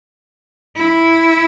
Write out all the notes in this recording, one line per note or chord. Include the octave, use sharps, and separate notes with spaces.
E4